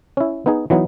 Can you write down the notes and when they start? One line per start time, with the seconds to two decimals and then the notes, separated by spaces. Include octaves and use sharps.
0.17 C#4 E4
0.46 B3 D#4 G#4
0.70 E3 F#3 B3 D#4